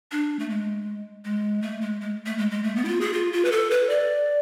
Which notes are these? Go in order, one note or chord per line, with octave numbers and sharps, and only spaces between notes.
D4
A3
G#3
G#3
A3
G#3
G#3
A3
G#3
G#3
A3
B3
E4
F4
G#4
F4
F4
B4
A4
B4
D5